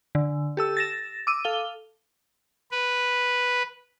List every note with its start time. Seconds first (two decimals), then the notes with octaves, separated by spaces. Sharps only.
0.15 D3
0.57 G4 A4 E6
0.77 A6 A#6 E7
1.27 D6 E6 D#7
1.45 A4 F5 G7
2.71 B4